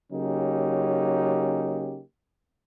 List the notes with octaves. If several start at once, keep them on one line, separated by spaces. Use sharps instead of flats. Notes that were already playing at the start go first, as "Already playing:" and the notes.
C#3 F#3 A#3 C#4 D#4 G4